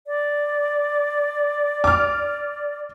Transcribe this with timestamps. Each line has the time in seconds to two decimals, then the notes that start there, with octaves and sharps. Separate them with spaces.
0.07 D5
1.84 D6 F6